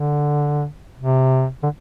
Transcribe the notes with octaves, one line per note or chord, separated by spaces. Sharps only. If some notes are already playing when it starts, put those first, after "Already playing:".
Already playing: D3
C3
D3